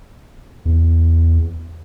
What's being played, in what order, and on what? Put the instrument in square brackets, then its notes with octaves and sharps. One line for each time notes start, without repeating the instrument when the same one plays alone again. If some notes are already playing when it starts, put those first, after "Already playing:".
[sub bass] E2